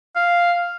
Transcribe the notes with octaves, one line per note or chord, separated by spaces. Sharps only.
F5